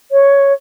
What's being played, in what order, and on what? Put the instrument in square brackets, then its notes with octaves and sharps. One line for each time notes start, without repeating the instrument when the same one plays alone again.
[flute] C#5